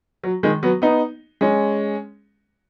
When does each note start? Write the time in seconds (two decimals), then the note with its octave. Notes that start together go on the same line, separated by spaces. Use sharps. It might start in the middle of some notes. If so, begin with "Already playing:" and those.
0.23 F#3
0.43 D#3 G#3
0.63 F#3 B3
0.82 B3 D#4
1.41 G#3 C#4